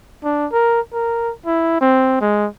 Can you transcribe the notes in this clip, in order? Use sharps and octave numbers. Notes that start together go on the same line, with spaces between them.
D4
A#4
A#4
E4
C4
G#3